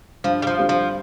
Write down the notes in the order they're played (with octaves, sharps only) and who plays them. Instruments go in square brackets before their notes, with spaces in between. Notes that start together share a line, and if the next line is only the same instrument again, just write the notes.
[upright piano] G2 [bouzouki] F3
[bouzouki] G3
F3
[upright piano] D3 G3 C4
[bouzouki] F3